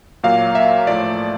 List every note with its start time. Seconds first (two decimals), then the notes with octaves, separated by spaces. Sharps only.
0.23 A#2 F#3 A#3 F5
0.55 E5
0.87 A2 F3 A3 D5